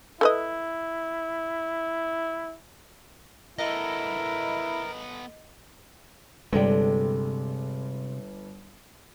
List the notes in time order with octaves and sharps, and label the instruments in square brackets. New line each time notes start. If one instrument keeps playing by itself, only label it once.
[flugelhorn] E4 [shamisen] A4 B4 D#5
[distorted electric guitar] B3 A4 [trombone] E4 [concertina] A#4 [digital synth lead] D#5
[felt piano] G1 D5 [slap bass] C3 G#3 [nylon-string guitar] A4 G5